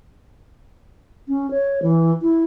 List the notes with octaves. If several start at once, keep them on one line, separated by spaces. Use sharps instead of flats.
C#4
C#5
E3
E4